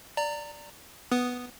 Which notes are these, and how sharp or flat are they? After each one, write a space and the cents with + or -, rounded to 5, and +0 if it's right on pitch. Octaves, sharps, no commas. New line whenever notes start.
D5 +0 A#5 -25
B3 +0 B4 +0 D#6 -5